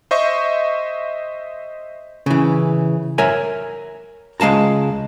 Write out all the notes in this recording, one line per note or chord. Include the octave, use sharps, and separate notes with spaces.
C5 D#5 E5 C#6
C#3 E3
A#4 C#5 E5 G#5
C#2 G#3 F5 A5 A#5